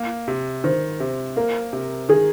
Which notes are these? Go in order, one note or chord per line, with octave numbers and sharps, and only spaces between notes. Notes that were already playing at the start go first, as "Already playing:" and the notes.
Already playing: A#3
C3
D#3 C5
C3
A#3 A#4
C3
D#3 G#4